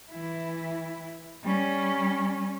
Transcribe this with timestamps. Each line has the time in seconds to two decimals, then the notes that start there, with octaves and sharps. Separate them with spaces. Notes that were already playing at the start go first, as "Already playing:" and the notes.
0.11 E3 E4
1.43 G3 C#4